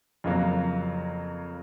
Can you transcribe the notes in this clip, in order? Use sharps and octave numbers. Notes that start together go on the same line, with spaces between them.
F2 C#3 F#3 A#3